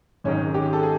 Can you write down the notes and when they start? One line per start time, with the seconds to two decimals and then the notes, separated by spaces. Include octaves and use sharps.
0.24 G#1 G#2 D#3 C#4
0.54 G4
0.73 A4
0.83 G#4